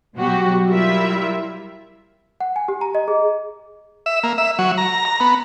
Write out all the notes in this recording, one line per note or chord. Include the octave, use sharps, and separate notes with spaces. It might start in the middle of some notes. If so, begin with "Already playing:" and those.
B2 F#3 F#4 G4
F#3 G3 E4 F4 A#4 E5
F#5
G#5
G4
A#5
D#5
G#4
E5
A#3
E5
F#3
A#5
A#5
B3